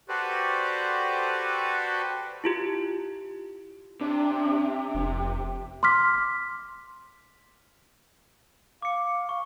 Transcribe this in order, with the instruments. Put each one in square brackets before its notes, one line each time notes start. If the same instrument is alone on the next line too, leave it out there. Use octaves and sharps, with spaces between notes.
[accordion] F#4 G4 A4 B4 C5 D5
[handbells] E4 F4 G4
[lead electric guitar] C3 [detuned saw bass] D4
[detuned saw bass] F1
[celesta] C6 D6 F6 B6
[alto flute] F5 [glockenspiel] D6 C#7
[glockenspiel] C#6